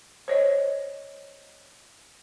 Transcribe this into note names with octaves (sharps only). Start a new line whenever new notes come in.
C5 C#5 D#5